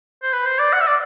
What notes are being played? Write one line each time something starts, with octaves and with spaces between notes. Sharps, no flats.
C5
B4
C5
D5
F#5
E5
D5